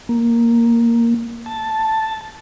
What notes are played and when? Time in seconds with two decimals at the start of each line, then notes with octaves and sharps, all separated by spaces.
0.09 A#3
1.46 A5